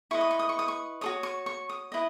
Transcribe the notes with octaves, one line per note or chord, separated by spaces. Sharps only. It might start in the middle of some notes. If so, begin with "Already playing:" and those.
E4 B4 D#5 C#6
D#6
C#6
D#6
C#6
D#6
C#6
F#4 A4 C#5 D#6
C#6
C#6
D#6
E4 B4 D#5